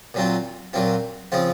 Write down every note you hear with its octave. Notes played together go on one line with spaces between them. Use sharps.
A#2 F#3 C4 F4
A#2 F#3 C4 F4
C#3 F3 C4 F4